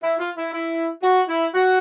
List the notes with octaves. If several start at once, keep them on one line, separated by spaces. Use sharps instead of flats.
E4
F4
E4
E4
F#4
E4
F#4